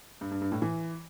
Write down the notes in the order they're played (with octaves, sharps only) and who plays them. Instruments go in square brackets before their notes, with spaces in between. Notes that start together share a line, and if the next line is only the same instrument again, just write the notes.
[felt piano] G2
G2
G2
A2
E3